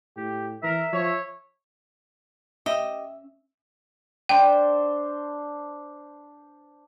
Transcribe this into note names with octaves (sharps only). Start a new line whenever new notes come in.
A2 G4
E3 A#4 E5
F3 C#5
C#4 G4 D#5 E5
D4 C5 G5